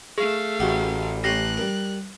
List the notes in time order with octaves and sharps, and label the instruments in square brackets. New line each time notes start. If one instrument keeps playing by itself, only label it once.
[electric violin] A3 F5 [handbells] G#4
[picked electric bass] A1 [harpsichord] F#4 G4
[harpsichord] A3 C#4 G4 [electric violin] F#6 [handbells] A#6 C7
[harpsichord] G3 A#4